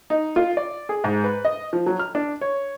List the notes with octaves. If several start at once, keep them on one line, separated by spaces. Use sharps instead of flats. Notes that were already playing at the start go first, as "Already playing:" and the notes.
D#4
F4
D5
G#4
G#2
B4
D#5
F3
F#3
F6
D4
C#5